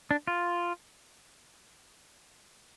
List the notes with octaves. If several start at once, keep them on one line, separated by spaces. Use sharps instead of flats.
D4
F4